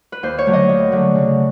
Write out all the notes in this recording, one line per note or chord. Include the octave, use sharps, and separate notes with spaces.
B4
D#2 C5
C#5
D3 F#3 A3
D#5
D#2
D3 F#3 A3
C#3